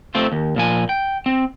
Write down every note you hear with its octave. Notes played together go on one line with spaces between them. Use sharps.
A3 C4 F4
D#2
A#2 F3 G#5
G5
C4